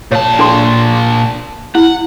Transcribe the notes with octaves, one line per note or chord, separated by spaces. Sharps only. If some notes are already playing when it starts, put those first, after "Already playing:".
A#2 C#5 A5
D4 A4 C6
E4 F#5